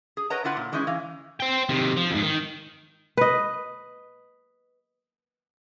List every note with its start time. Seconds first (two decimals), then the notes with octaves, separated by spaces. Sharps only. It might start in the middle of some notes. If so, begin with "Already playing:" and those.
0.17 G#4
0.30 A#4 B4 C#5 D#5 F#5 A#5
0.44 D3 E4 F4 F#5
0.57 A#2
0.72 E3 G#3 C#4 D#4 E4
0.87 E3 F5
1.40 C5 G5
1.69 C3 D#3
1.97 F3
2.11 F2 G#2
2.22 D#3
3.17 B4 D#5